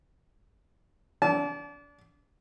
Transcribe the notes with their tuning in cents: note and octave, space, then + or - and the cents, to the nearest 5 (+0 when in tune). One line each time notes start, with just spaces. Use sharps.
D4 -30 A5 -35